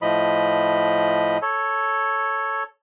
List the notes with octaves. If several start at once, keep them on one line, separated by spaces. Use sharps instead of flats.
A2 F3 D#5 B5
A4 C#5